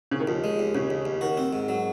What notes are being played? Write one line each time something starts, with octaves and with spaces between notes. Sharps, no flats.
C#3
D#3
D#2 F3
G#3
D#2
D#2 C#3
D#2
D#2
D#3 F#4
C4
G#2
F#3